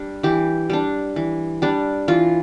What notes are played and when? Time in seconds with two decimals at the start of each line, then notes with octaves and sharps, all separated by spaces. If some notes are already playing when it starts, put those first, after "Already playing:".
Already playing: G3 D4
0.23 E3 G4
0.70 G3 D4
1.16 E3
1.62 G3 D4
2.08 E3 F4